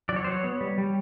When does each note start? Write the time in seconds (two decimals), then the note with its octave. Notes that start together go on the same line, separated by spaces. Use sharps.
0.09 F#3 D5
0.16 C#5
0.24 F#3 C5
0.32 C#5
0.44 B3
0.61 G3
0.78 G3